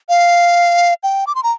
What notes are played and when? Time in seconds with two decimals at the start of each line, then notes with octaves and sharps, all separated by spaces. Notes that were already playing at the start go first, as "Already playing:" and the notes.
0.09 F5
1.03 G5
1.27 D6
1.35 C6
1.43 A#5